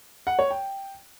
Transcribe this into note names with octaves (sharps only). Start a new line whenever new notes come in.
F#5
C#5
G5